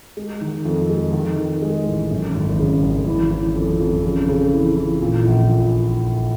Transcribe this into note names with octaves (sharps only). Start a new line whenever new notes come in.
G#3
D#3
F2
G#3
D#3
D#3
G#3
A1
F#2
G#1
C#3
G#1
E3
E3
F2
F2
C#3
C#3
E3
E3
A#2
A#1
A#2